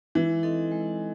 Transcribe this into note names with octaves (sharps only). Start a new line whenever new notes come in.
E3 G#3
C4 D#4 A4 D#5
G#3